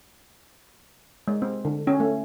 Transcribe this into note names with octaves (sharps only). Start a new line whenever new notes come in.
G#3
C4
D3
C#4
A3